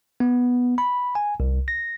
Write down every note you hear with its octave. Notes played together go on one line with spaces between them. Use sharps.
B3
B5
G#5
C2
A#6